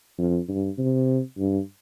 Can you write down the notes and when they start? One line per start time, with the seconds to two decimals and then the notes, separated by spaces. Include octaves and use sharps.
0.18 F2
0.48 G2
0.78 C3
1.38 G2